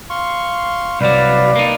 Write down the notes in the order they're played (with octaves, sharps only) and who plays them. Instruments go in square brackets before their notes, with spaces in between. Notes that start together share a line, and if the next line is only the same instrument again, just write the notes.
[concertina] F5 C6 C#6
[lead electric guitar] C2 F#3 [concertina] B4 F5 [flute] D5
[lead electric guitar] A#3 D#4